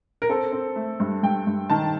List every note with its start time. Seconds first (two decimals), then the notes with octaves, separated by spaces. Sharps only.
0.22 A#4
0.29 C4 A4
0.52 C4
0.76 A3
1.00 G2
1.23 G2 G5
1.47 G2
1.70 D#3 A5